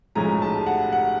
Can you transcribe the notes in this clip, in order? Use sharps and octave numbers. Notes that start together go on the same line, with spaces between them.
B1 A2 F3 G#3 C#4 A#5
A5
F#5
F#5